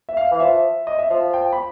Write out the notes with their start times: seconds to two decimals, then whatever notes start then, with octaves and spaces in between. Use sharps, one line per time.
0.09 E5
0.17 F5
0.31 E3
0.35 F5
0.40 F3 E5
0.87 D#5
0.99 E5
1.10 F3 F5
1.33 G5
1.53 B5